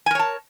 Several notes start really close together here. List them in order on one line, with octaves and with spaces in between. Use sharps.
G#5 A#4 C#5 A5